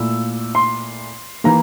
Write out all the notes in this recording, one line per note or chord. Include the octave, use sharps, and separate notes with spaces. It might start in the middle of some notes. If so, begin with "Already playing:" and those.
Already playing: A#2 A3 E4 E6
C6
E3 A#3 A#5